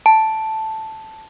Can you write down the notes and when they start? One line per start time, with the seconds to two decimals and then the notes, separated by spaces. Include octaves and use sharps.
0.06 A5